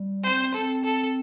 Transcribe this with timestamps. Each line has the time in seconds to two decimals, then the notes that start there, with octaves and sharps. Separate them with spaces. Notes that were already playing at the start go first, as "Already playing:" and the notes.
Already playing: G3
0.24 C4 C5
0.54 C4 A4
0.84 A4